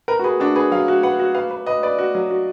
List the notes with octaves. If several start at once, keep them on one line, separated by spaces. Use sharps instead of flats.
A#4 B4
F#4
G#4 B4
D4 F#4
G#4 B4
F#3 F5
F#4
B4 F#5
F#4
B4 F5
B4
B4 D#5
B4 D5
F#4
F#3
F#4